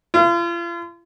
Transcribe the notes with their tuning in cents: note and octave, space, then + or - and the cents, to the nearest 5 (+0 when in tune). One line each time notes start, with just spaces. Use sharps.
F4 -40